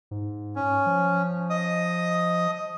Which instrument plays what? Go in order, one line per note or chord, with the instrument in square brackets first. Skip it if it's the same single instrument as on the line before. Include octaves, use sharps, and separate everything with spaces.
[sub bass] G#2
[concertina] C#4
[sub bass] F3
[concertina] D#5 D#6